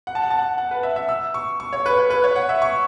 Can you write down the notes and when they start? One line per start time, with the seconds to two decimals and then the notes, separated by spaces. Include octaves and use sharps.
0.07 F#5
0.15 A5
0.23 F#5
0.30 A5
0.39 F#5
0.58 F#5
0.71 B4
0.83 E5
0.96 E5
1.09 E6
1.34 C#6
1.60 C#6
1.73 C#5
1.86 B4
1.98 B4
2.10 B4
2.24 C#5
2.36 F#5
2.49 E5
2.62 C#6